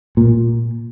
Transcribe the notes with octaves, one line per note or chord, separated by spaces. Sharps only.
A#2